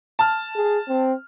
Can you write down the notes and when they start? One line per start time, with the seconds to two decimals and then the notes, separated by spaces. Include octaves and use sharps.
0.19 A5 F6
0.56 G#4
0.88 C4